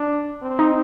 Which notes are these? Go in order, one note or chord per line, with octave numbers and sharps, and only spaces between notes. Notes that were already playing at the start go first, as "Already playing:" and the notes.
Already playing: D4
C4
D#4